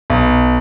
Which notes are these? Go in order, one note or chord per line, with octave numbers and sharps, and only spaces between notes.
B1